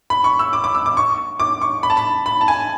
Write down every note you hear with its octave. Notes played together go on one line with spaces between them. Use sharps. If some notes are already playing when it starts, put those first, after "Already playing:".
B5
C#6
E6
D6
D6
E6
D6
C#6
D6
C#6
B5
A5
B5
B5
A5
G#5